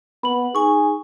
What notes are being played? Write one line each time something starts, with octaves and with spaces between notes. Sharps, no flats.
B3 B5 F#7
D#4 G#4 G#5 C#6